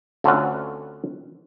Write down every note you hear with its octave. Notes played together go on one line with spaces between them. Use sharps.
D2 D3 C4 C#4 F4 F#5